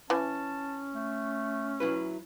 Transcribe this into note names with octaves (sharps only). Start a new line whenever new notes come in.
E3 C#4 A5
A3
F#3 E4 B4